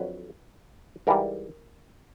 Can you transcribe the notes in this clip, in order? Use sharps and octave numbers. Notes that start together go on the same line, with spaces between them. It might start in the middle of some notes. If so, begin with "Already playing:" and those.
Already playing: F2 D3 F#3 B4
G#2 E3 G3 A#4